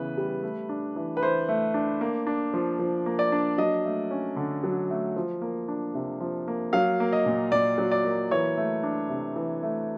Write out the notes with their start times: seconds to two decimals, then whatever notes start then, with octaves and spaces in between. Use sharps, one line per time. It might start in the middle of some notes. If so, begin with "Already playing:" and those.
Already playing: C#3 E3 B3 B4
0.18 G3
0.43 A3
0.69 D4
0.96 E3
1.17 B4
1.22 E3 C5
1.49 A3
1.74 D4
2.01 A#3
2.27 D4
2.54 F3
2.79 F3
3.06 A#3
3.19 D5
3.32 D4
3.58 F#3 D#5
3.85 A3
4.11 C#4
4.36 D3
4.64 F#3
4.90 A3
5.16 F3
5.42 A#3
5.68 D4
5.95 C3
6.20 F3
6.48 A#3
6.73 F#3 F5
7.00 A#3
7.13 D#5
7.26 A#2
7.52 A#2 D5
7.78 F#3
7.91 D5
8.05 A#3
8.31 E3 C#5
8.57 A3
8.83 D4
9.09 C3
9.36 E3
9.63 A3